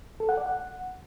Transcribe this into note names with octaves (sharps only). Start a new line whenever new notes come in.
A4
F#5
D5
F#5